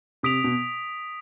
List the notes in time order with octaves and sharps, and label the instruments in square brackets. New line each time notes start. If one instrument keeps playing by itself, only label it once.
[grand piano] C3 [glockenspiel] D#6 B6 D7 F7
[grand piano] B2